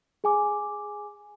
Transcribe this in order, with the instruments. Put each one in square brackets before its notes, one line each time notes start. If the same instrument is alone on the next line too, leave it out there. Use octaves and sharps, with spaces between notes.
[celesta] G#4 G#5 D6